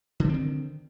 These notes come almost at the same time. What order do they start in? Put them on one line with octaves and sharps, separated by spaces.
D3 F3 C4 D#3